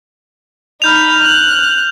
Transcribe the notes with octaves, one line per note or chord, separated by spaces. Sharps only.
D#4 B5 F6 G6 F7
F#6